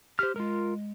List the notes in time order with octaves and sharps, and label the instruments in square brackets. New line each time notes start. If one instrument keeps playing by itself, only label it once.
[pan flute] G4 [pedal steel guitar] C5 F6
[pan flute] G#3 [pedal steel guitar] F4 A#4